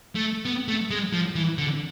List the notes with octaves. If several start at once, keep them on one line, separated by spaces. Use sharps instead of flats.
A3
B3
A3
G#3
F3
E3
D3